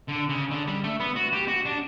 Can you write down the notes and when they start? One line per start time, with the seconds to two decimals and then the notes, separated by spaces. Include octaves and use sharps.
0.08 D3
0.29 C#3
0.51 D3
0.67 G3
0.84 A3
1.00 B3
1.16 F#4
1.33 G4
1.48 F#4
1.65 D4